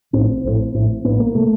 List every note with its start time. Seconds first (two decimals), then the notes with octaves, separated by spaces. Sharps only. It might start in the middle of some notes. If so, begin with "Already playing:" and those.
0.13 A#1 A2 C4
0.44 A#1 A2
0.74 A#1 A2
1.04 A#1 A2 B3
1.20 A#3
1.35 C3 A3